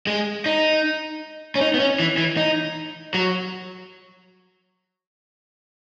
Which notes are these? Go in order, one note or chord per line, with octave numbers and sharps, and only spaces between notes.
G#3
D#4
C#4
D#4
B3
C#4
E3
E3
D#4
F#3